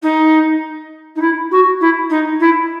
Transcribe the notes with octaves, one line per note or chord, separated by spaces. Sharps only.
D#4
D#4
E4
F#4
E4
D#4
E4